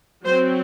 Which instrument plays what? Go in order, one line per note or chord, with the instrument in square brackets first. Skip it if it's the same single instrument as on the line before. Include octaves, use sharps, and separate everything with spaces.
[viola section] F#3 C4 C5